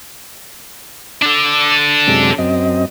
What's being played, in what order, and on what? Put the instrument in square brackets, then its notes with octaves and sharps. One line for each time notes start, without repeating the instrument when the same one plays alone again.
[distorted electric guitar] D4 A4 [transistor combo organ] D6
[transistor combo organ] F#2 C3 G#3
F#2 C4 D#5